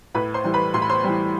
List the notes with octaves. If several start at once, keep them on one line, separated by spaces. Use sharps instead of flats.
A2 B4 B5
C5 C6
E3 G3
B4 B5
A2 C6
B5
C5 C6
E3 G3